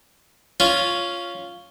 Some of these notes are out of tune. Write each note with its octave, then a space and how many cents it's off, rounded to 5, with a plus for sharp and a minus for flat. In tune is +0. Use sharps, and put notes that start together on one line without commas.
C#4 +5 F4 +0